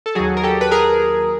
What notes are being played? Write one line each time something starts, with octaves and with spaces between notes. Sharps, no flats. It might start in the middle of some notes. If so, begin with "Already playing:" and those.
A4
D#2 D#3 F#3 F#4 G#4
A#4
G4 A4
B4
G#4 A#4